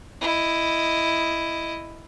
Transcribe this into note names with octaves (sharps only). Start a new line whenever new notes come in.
E4 D#5